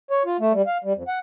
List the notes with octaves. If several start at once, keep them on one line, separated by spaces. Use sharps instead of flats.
C#5
F4
A3
G3
F5
G3
F2
F#5